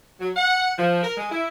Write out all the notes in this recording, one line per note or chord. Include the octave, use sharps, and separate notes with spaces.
F#3
F#5
F3
A#4
G#3
E4